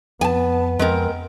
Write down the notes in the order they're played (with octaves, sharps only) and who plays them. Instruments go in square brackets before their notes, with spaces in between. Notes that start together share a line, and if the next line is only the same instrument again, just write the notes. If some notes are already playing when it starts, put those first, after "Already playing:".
[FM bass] F2 [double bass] B3 [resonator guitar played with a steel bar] G#5 A5
[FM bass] F2 [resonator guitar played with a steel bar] G#3 C4 A#4